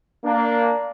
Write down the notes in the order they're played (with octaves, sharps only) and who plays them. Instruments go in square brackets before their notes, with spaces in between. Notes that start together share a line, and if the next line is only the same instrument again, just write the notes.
[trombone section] A#3 D4